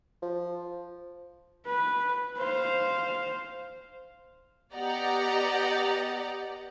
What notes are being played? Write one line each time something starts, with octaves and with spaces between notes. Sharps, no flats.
F3
B4
C5 F5
B3 G4 D5 D#5 F#5 A#5